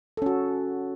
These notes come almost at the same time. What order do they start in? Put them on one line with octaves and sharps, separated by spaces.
A4 C#4 F#4